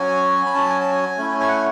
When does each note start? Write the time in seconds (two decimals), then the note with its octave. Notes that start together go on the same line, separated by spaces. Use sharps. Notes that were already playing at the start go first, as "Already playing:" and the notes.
Already playing: F#3 C#4 F#4 G#5
0.46 B5
0.54 F#3 C#4 F#4 A5
0.70 G#5
0.80 A5
0.92 G#5
1.17 A3 C#4 E4
1.40 G#5
1.48 F#5